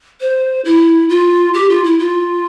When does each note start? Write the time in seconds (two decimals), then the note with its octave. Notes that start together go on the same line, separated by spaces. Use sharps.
0.21 C5
0.65 E4
1.09 F4
1.54 G4
1.70 F4
1.84 E4
1.99 F4